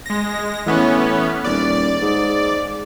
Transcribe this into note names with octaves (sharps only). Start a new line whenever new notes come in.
G#3 A#6
A2 E3 B3 C#4
D#1 D5
G#2